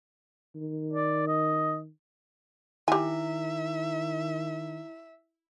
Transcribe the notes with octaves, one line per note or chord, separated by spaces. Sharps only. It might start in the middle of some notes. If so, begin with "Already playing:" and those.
D#3
D5
D#5
D#3 E4 G4 E5 G#5